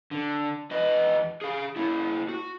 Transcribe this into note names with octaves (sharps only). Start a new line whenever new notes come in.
D3
E2 B4 D#5
G#4 F5
A#3 E4
F#4